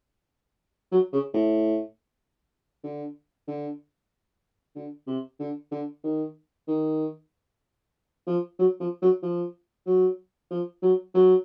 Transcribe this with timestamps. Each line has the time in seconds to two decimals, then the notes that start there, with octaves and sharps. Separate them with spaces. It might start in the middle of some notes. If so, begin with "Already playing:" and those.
0.92 F#3
1.13 C#3
1.34 A2
2.83 D3
3.47 D3
4.76 D3
5.07 C3
5.39 D3
5.71 D3
6.04 D#3
6.67 D#3
8.27 F3
8.59 F#3
8.80 F3
9.02 F#3
9.23 F3
9.87 F#3
10.50 F3
10.82 F#3
11.15 F#3